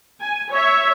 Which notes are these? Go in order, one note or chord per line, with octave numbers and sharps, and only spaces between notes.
G#5
C#5 E5